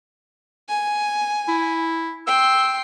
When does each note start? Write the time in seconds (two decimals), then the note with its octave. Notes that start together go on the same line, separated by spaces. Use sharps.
0.69 G#5
1.48 E4
2.27 G5 C6 E6